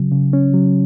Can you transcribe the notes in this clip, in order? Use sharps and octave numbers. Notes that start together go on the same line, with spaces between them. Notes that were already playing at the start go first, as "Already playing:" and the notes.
Already playing: C#3 F#3
C#3
C#4
F#3